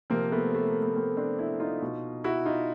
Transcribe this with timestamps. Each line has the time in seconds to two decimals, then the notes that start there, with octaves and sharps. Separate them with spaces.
0.10 C3 F3 A#3 C4
0.32 A3 B3
0.55 A3
0.68 A#3
0.82 B3
0.95 A#3 C4
1.17 C4 D4
1.39 D4 E4
1.60 D#4 F4
1.82 B2
2.24 E4 F#4
2.45 D#4 F4